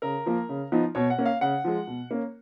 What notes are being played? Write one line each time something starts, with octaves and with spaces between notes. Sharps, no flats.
C#3 A#4
F3 A#3
C#3
F3 B3 D#4
B2 C#5
F#5
A#3 C#4
F5
C#3 F#5
F3 G#3
B2
A#3 C#4